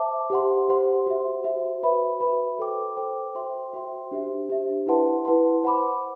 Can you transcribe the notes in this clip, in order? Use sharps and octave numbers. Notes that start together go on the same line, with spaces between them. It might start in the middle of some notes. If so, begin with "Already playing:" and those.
Already playing: C5 E5 A5 D6
G4 C5 F#5 C6
G4 C5 F#5 C6
F#4 C5 E5
F#4 C5 E5
F#4 B4 E5 B5
F#4 B4 E5 B5
A4 C5 G5 D6
A4 C5 G5 D6
F#4 C5 E5 G5 C6
F#4 C5 E5 G5 C6
D4 G4 C5 E5
D4 G4 C5 E5
E4 B4 F#5 A5 C6
E4 B4 F#5 A5 C6
C5 F#5 B5 D6